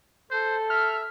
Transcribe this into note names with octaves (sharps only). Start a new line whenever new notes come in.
A4 C5
E5 F6